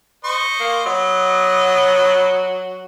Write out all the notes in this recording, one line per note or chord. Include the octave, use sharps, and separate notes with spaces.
C5 D#5 C#6
A#3
F#3 B3 D#5